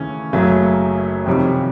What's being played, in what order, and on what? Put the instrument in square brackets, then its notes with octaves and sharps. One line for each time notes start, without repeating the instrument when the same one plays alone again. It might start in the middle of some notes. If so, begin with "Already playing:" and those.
Already playing: [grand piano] D#2 C#3 E3 A3 C#4
F#1 F#2 C#3 F#3 A3
F2 C3 D#3 G3